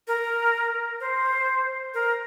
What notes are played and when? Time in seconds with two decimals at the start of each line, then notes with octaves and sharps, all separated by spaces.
0.07 A#4
1.00 C5
1.94 A#4